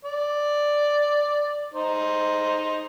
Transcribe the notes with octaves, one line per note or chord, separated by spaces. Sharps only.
D5
D#4 C5